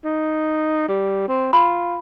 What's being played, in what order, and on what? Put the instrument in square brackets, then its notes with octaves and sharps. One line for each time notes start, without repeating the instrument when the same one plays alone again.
[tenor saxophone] D#4
G3
C4
[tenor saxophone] F4 [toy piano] B5